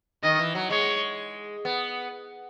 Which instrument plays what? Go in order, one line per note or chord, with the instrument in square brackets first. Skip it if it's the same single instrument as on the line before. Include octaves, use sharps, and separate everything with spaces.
[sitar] D#3 [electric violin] D#5
[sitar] E3
F#3
[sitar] G#3 [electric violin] C#5
[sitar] B3